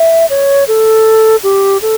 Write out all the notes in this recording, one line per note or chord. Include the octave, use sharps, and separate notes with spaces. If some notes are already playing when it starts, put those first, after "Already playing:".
Already playing: E5
C#5
A4
G4
A4